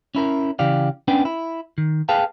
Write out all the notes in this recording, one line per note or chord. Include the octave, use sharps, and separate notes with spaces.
C#4 E4 A#4
C#3 E3 G4 D5 F5
B3 C#4 D4 B4 G5
E4
D#3
G#4 B4 F5 G5 A5